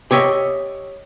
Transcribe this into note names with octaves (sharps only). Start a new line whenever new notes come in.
G4 C#5 D#5 E5